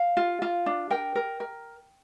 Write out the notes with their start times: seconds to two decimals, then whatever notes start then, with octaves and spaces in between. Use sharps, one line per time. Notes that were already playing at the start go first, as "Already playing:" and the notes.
Already playing: F5
0.17 F4
0.42 F4
0.66 D4
0.90 A#4 G5
1.15 A#4
1.40 A#4